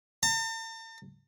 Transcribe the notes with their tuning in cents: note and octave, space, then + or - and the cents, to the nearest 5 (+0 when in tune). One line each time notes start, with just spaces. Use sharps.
A5 +45